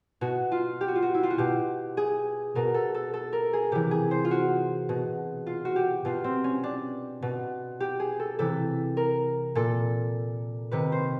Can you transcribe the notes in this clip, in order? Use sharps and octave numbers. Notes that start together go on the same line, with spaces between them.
B2 F#4
F4
G4
F#4
F4
F#4
E4
F4
F#4
B2 G4
G#4
B2 A#4
A4
A4
A4
A#4
G#4
C3 E3 G4
G#4
C5
F4
F#4
B2
F4
F#4
G4
B2 F4
C4
C#4
D4
B2
G4
G#4
A4
C3 E3 A4
A#4
A#2 A4
C3 D#3 B4
C5